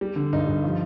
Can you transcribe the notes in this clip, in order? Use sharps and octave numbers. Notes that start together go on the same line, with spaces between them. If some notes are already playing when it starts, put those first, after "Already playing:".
G3
D3
G2 D#4
G2
F3